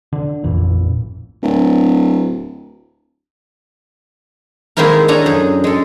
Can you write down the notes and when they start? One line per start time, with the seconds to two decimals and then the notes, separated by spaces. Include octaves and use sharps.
0.13 D3 D4
0.44 A1 F2 A#2 E3
1.42 D1
4.77 D#3 G#3 A#3 C4 E4 A#4
5.08 C#4 D4 A4 G#5 A#5
5.26 F#2 G#4
5.64 G#3 A4